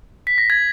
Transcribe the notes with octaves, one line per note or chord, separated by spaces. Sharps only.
B6
A#6
G#6